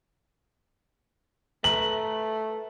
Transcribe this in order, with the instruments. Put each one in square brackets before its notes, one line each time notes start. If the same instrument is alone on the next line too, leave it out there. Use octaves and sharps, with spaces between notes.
[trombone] A3 [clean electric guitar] B4 A#5 [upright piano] F#7